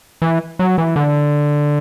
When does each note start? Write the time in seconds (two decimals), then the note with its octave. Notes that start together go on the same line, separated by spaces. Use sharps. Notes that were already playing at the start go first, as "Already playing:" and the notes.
0.22 E3
0.59 F#3
0.78 E3
0.96 D3